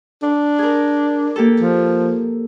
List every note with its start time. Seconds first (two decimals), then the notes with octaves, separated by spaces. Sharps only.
0.23 D4
0.59 G#4 A#4
1.36 A#3 G4 A4
1.60 F3